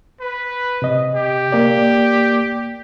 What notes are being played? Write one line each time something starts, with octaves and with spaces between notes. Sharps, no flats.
B4
C3 D#5
G4
A#3 D5